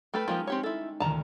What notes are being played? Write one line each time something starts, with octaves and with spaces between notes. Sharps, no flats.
A3 A4 B4 G5 F6
F3 G#3 A#3 C#4 D#4 G4
C4 G4 C#5
E4 A4
E1 D2 D#3 A5 A#5